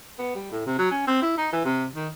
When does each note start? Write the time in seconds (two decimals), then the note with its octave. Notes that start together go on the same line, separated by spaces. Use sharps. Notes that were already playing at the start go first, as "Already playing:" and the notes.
0.19 B3
0.35 G3
0.52 A2
0.66 C3
0.79 F#3
0.91 C#4
1.07 C4
1.22 E4
1.38 D#4
1.53 E3
1.65 C3
1.96 D#3